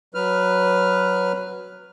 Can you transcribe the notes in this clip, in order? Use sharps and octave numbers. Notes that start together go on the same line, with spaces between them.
F#3 B4 F6